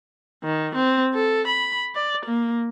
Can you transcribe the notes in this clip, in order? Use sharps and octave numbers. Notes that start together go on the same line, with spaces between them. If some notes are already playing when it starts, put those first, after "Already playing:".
D#3
C4
A4
B5
D5
A#3